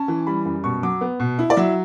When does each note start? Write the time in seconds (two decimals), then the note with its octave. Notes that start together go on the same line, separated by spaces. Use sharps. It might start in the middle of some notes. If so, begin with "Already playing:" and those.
Already playing: C#4 A5
0.08 E3
0.27 G3 B5
0.45 F#2
0.64 B2 C#6
0.83 F#3 D6
1.01 B3
1.20 B2
1.39 E4
1.50 D5
1.57 F#3 E5